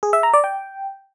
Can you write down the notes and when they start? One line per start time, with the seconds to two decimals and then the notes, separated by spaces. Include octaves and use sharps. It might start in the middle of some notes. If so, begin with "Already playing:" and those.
0.03 G#4
0.13 E5
0.23 A#5
0.34 D5
0.44 G5